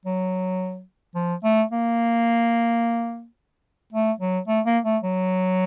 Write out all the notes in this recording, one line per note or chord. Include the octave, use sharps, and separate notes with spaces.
F#3
F3
A3
A#3
A3
F#3
A3
A#3
A3
F#3